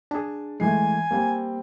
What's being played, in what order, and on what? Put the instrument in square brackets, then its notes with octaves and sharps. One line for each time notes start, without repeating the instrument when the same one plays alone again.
[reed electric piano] D4 G#4 [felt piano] A5
[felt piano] E3 C7 [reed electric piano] G#3 A3 [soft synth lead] G#5
[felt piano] G3 C4 [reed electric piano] A#3